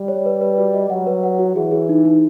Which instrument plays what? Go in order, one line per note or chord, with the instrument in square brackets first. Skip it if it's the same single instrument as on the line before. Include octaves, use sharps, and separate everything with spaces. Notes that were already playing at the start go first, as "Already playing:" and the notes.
Already playing: [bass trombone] G3
[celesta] C#5
B4
B4
F#4
D#5
[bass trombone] F#3 [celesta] F#5
[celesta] B4
F#5
F#4
[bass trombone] E3 [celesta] G#4
[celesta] G#4
D#4
D#4